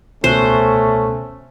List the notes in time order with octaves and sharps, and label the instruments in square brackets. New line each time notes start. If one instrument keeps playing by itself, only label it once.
[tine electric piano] C#2 B2 F#6 [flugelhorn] A3 [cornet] C#4 [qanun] C5